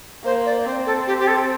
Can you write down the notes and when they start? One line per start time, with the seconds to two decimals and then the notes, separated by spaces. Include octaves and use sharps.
0.25 A#3 C5
0.45 D5
0.66 C4 C5
0.86 A4
1.07 G4
1.19 G4
1.27 A4